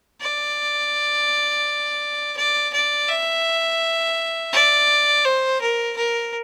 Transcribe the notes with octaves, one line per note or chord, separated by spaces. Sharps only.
D5
D5
D5
E5
D5
C5
A#4
A#4